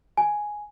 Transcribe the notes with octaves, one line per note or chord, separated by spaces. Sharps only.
G#5